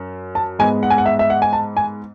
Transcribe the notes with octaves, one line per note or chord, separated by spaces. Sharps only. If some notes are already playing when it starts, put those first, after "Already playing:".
Already playing: F#2
A5
G#2 G#3 B3 G#5
F#5
G#5
F#5
E5
E5
F#5
G#5
A5
G#5